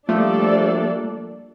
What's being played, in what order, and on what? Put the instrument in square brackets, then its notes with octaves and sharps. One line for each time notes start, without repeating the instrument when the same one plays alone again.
[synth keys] F3 A3 [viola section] G3 A#3 D4 A4 D5